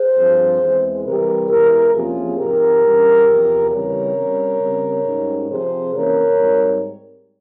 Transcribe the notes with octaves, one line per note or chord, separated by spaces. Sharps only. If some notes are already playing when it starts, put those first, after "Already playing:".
Already playing: G#4 C5
G2 F3 C4
E2 E3 G#3 C4
C3 E3 G3 G4 A#4
E2 E3 G#3 G4 A#4
E2 C3 F3 A#3 C#4 F4 G#4
G#2 F3 C4 G4 A#4
G2 E3 G3 C#4
E2 C3 F3
C#3 E3 G3 C4 A#4 C#5
C3 G3 C#4
C#3 G3 C4
G#2 G3 C#4
C3 F3 C4 G#4 C5
C3 E3 A#3 C#4 A#4 C#5
G#2 G3 C4